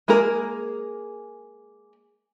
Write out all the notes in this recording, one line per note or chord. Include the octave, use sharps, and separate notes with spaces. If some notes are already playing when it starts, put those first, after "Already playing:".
G#3 A#3 G#4 A#4